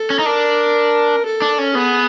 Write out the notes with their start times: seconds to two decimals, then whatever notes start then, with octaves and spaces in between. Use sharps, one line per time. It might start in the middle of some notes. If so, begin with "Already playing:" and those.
Already playing: A4
0.10 C#4
0.19 D#4
0.26 D4 A#4
1.26 A4
1.42 D4
1.58 C#4
1.74 B3 G#4